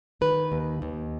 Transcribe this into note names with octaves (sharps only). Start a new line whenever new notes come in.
D#3 B4
D#2
D#2